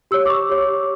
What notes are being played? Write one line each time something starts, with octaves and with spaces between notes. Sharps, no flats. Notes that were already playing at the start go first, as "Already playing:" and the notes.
G4 C#5 E6
D6
C#6
G4 C#5